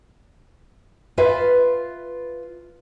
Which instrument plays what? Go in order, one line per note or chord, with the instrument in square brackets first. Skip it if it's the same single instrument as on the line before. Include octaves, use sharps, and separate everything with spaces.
[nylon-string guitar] F4 B4 E5 F5